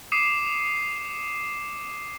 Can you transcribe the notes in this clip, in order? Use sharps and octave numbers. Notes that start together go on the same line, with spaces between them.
D6 D#6 C7 C#7 D#7 E7